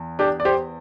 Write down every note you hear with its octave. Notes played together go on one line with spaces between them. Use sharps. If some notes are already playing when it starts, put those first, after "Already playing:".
Already playing: E2
D4 G4
D5
G4 C5